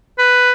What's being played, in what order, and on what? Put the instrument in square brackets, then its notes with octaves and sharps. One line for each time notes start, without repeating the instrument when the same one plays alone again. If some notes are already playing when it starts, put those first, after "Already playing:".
[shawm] B4